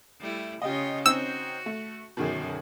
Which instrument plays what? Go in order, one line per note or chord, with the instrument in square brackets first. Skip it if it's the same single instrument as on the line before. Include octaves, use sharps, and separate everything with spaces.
[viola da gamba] G3 A3 E4
[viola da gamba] C#3 C#4 F4 [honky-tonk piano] G4 D#5
[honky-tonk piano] C4 C#4 D#4 [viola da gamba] F#4 [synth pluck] E6
[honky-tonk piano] A3
[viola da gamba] F#2 D3 [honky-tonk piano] B2 D#3 G#4